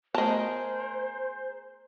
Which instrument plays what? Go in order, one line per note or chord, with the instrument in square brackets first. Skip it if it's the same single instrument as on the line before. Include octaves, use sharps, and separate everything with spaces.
[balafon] A3 B3 [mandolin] G#4 A#4 [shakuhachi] C5 [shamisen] D#5 A5